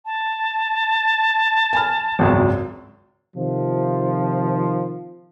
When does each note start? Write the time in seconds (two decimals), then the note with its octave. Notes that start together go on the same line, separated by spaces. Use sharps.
0.05 A5
1.73 G#5 B5 F6
2.19 G#1 C#2 F#2
3.35 C3 D#3 F3